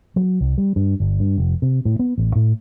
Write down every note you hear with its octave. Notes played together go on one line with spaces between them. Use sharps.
F#3
C2
G3
G2
G1
G2
F1
C3
A2
B3
A1
A2